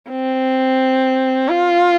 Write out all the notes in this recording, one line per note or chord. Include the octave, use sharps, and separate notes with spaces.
C4
F4